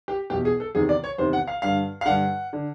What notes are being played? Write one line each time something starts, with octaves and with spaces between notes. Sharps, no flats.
G4
E2 B2 G4
G#4
A4
E2 C3 D#3 G#4
D5
C#5
E2 C3 D#3 C5
F#5
F5
G2 D3 F5
F5
G2 D3 F#5
D3